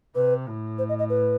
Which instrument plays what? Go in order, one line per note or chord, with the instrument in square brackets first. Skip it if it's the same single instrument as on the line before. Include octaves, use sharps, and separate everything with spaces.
[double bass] C3 [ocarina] B4
[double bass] A2
[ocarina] C5
D#5
D#5
B4